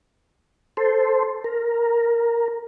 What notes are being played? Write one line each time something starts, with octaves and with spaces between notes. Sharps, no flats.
A4 C5
A#4